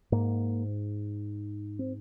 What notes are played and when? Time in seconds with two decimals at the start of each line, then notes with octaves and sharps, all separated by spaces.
0.12 G#2 A#3
1.79 C4